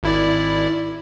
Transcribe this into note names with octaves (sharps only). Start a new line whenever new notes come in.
G#1 E4 D5